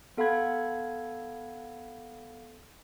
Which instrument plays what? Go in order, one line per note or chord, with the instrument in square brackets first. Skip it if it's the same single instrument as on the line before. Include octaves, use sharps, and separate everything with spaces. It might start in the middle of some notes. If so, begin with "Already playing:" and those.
[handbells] B3 A4 F5 F#5 B5 G#6